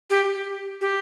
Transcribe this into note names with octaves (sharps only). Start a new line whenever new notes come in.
G4
G4